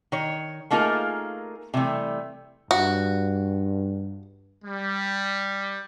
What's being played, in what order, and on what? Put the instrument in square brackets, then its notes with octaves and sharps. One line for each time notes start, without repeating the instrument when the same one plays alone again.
[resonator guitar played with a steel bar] D#3 C#5
A3 A#3 D#4 F4 G#4 A#4
C3 E3 G3 A3
[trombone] G2 [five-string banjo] F#4
[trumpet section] G3